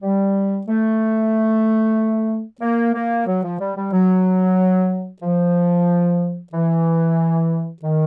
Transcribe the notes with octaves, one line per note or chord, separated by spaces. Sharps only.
G3
A3
A#3
A#3
F#3
F3
G3
G3
F#3
F3
E3
D#3